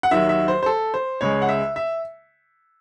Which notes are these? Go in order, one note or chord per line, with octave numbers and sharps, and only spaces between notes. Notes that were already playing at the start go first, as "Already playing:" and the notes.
F#5
D#2 D#3 F#3 E5
E5
C5
C5
A4
C5
C#2 C#3 G#3 C#5
F#5
E5
E5